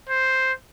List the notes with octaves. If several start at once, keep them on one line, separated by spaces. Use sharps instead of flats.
C5